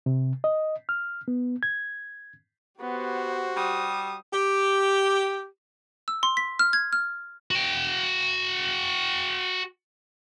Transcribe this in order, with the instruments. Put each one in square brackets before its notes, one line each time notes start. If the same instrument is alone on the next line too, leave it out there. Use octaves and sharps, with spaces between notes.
[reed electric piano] C3
D#5
F6
B3
G#6
[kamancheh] B3 [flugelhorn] F#4 [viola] G4 C5
[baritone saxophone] G3 [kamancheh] D#6
[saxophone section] G4
[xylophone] E6
C6
B6
F6
G#6
F6
[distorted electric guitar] F#4 G5